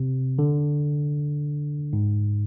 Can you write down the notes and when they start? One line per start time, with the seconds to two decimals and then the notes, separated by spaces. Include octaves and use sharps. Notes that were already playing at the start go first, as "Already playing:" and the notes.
Already playing: C3
0.39 D3
1.93 G#2